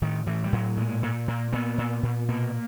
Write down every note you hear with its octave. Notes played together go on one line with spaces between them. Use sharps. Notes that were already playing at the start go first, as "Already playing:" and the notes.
A2 D#3
A2 E3
G3
A2 F#3
A#2 G#3
A#2
A#2 A#3
A#2 B3
A#2
A#2
B2 A#3